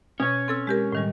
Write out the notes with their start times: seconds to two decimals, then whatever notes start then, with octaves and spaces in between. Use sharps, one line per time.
0.20 B2 C#4 C#5
0.48 C4 A4 E6
0.67 G#3 G4 A#4
0.92 A2 D#3 G3